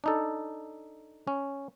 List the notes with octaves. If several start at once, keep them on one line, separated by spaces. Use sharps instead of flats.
D4 D#4 A4
C#4